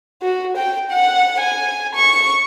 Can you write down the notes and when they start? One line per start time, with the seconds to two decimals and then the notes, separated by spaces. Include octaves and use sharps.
0.22 F#4
0.56 G5
0.90 F#5
1.40 G#5
1.95 C#6